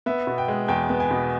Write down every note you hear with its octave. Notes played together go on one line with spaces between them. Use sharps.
B3 E5
B2
G5
G#3
E2 G5
B3
G#5
B2